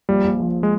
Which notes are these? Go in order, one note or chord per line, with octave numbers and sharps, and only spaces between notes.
A#1 G3
A#1
F3
G#3